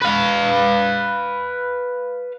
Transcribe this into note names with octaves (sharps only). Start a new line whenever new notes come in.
B4 F5